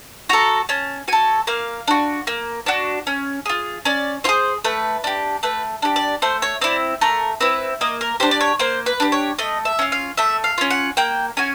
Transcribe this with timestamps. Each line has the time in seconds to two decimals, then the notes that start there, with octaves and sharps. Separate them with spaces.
0.29 F#4 A4 A#5
0.69 C#4 A5
1.08 F#4 A4 G#5
1.47 A#3 F5
1.88 D4 F#4
2.27 A#3
2.66 D4 F#4
3.07 C#4
3.46 F4 G#4
3.85 C#4 D5
4.24 F4 C5
4.29 G#4
4.64 A3 B4
5.04 D4 G4
5.43 A3 B4
5.82 D4 G4
5.96 D5
6.22 A3 C5
6.42 C#5
6.61 C4 E4 D5
7.01 A3 A#4
7.41 C4 E4 B4
7.81 A#3 D#5
8.01 A#4
8.20 D4 G4 C5
8.31 D5
8.41 C#5
8.59 A#3 C5
8.86 B4
9.00 D4 G4
9.12 C#5
9.38 A3 D#5
9.65 E5
9.79 C#4 F4
9.92 F5
10.17 A3 E5
10.44 F5
10.58 C#4 F4
10.70 F#5
10.97 A#3 G5
11.37 C#4 F#4 G#5